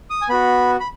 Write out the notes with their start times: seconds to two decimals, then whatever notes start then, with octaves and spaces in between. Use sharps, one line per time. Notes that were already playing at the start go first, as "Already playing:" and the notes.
0.10 D#6
0.21 G#5
0.29 B3 F#4 B5
0.80 B5